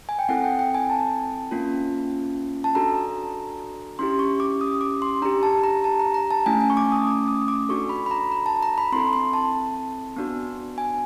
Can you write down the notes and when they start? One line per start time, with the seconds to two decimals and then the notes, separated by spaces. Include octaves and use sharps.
0.09 G#5
0.19 G5
0.29 C4 E4 A4 F#5
0.44 G5
0.59 G5
0.75 G#5
0.90 A5
1.51 A#3 C#4 F4
2.64 A5
2.75 D4 F#4 A4 A#5
3.99 C#4 E4 G4 C6
4.19 C#6
4.40 D6
4.61 D#6
4.81 D6
5.02 C6
5.22 D4 G4 A#5
5.43 A5
5.63 A#5
5.84 A5
5.99 A#5
6.14 A#5
6.31 A5
6.46 A3 C#4 E4 G#5
6.61 G#5
6.70 C#6
6.77 D6
6.92 D#6
7.07 D6
7.28 D#6
7.48 D6
7.69 D4 F#4 A4 C#6
7.89 B5
8.06 B5
8.11 A#5
8.32 A#5
8.46 A5
8.63 A#5
8.78 B5
8.92 C4 E4 A4 C6
9.13 C6
9.33 A5
10.16 B3 D4 F#4
10.78 G#5